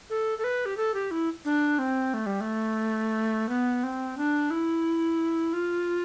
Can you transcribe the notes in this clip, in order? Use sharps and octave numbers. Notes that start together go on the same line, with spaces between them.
A4
A4
B4
G4
A4
G4
E4
D4
C4
A3
G3
A3
B3
C4
D4
E4
F4